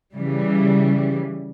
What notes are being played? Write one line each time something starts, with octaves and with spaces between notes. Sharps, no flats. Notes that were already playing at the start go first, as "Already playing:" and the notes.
C#3 E3 G3